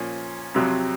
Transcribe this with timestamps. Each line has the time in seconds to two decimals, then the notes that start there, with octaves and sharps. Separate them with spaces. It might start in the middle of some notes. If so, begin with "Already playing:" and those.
Already playing: A#2 F3 C#4
0.55 F2 C3 F#3